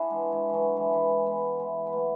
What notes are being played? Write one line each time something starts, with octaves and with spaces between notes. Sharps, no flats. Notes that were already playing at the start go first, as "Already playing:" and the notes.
Already playing: D4 E4 F#4 G#4
E3 G#3
E3 G#3
D3 E3 F#3
E3 G#3
E3 G#3
G#3 B3
E3 G#3
B3
F#3 A3